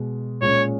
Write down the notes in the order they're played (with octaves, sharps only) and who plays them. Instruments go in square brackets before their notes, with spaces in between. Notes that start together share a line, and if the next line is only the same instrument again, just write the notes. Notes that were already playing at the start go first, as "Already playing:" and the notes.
Already playing: [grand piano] B2 G#3
[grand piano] A#2 G#3 C#4 [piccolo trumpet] C#5